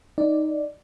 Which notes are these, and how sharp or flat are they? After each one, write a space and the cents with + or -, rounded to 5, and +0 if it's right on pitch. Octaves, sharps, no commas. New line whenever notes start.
D#4 +0 D5 +0